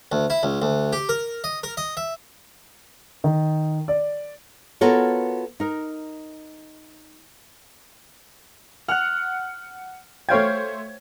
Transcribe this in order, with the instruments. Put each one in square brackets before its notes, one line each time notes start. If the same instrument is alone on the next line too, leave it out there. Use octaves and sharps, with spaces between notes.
[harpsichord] D2
E4
C#2
D2
G4
A#4
D#5
A#4
D#5
E5
[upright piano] D#3
D5
[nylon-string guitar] B3 F4 F#4 A4 A#4 C#5
D#4 A#4
[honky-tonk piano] F#5 [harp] F6 F#6
[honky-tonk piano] A3 C5 G#6 [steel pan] C#5 F5 G5